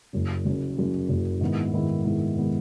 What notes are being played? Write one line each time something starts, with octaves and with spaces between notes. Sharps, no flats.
F#1 F#2 C#3
F#1 F#2 C#3
F#1 F#2 C#3
F#1 F#2 C#3
G#2 D#3 G#3 B3 E4
G#2 D#3 G#3 B3 E4
G#2 D#3 G#3 B3 E4
D#3 G#3 B3 E4